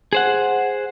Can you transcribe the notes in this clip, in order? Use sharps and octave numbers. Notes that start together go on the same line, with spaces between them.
G#4 C5 F#5